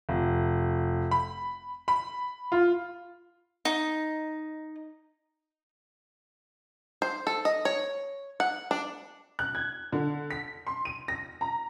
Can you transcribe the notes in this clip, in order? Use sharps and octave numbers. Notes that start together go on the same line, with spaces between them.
F1
B5
B5
F4
D#4
C5
A4
D#5
C#5
F#5
D4
F#6
G#6
D3
B6
C6
D#7
A#6
A#5